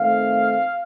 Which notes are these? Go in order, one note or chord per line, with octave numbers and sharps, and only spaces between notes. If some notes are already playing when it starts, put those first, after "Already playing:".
Already playing: D#3 A3 C4 F5